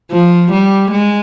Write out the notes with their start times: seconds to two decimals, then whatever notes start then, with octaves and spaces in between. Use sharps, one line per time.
0.12 F3
0.52 G3
0.92 G#3